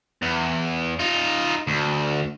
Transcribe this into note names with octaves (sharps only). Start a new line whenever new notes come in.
E2
D#4 F4
D2